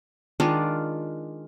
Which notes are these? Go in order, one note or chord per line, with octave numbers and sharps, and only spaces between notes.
D#3 G#3 D4 F4